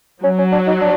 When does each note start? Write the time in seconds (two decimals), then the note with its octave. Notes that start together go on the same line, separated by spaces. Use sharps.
0.23 F#3 C#4
0.38 C#4
0.52 D4
0.67 D#4
0.81 D4